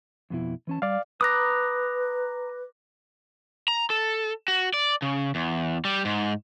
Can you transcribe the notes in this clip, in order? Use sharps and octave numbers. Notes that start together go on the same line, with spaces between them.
F2 B2 E4
E3 C#4 A5
G3 D5 F5
B4 A#5 B5 D6 D#6 F#6 A#6
A#5
A4
F#4
D5
C#3
E2
G3
G#2